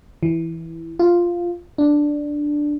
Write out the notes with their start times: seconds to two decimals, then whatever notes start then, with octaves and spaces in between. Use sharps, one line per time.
0.23 E3
0.99 F4
1.78 D4